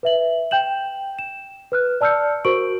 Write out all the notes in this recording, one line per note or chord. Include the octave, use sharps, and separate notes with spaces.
B4 E5 F#7
G5 G6 E7 F#7
E7
B4 F6 F#6
D5 A5 E6 F6 G6 C#7
F#4 A#4 C5 C#6 D7 F#7